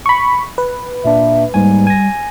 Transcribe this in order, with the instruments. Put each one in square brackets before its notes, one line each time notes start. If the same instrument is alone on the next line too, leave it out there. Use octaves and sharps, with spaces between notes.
[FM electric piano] B5 C#6
B4
[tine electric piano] A#2 A#3 D4 [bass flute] E5
[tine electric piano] G#2 A#3 G#5 [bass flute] G3
[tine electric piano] G#5 A#6